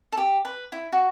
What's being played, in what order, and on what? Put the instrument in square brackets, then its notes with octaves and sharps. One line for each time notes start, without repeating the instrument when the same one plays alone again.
[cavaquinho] A4
G4
B4
E4
F#4